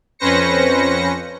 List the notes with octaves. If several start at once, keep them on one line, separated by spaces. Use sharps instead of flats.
F2 C#4 B4 C5 A#6 C#7